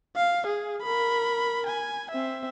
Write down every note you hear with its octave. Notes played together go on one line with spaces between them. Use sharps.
F5
G#4
A#4 B5
G#5
C4 E5